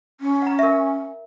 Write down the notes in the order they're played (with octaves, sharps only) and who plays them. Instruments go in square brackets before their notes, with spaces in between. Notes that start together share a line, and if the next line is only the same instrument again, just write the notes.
[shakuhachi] C#4
[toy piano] F#5 A#5
A#4 E5